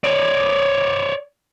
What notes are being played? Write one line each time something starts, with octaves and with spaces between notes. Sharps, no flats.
C#5 D5